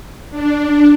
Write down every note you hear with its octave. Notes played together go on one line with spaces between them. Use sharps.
D4